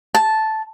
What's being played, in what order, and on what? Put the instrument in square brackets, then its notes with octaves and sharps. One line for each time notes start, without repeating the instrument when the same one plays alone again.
[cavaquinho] A5